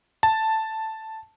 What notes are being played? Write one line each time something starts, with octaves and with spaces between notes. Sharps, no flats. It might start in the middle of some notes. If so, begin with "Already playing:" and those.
A5